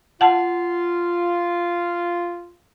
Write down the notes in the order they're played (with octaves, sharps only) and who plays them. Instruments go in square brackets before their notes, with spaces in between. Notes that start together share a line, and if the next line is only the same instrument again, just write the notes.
[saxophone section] F4 [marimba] F#5 A5